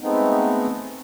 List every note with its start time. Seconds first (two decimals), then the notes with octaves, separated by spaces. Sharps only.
0.01 G#3 A3 B3 C4 D#4